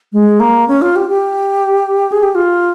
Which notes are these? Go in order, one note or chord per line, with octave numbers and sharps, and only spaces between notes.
G#3
A#3
C#4
F4
G4
G4
G#4
G4
F4